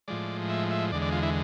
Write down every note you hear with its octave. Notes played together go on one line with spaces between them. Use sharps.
A2 F3 G#3 D5
E5
E5
E2 D3 G#3 D5
D5
F4
E4